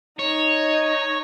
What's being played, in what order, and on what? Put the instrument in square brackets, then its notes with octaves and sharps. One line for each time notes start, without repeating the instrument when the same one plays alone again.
[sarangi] D#4 [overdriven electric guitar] C#5